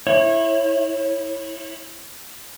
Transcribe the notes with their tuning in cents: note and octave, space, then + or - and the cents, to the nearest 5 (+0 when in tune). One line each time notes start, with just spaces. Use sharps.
E4 +0 C#5 -30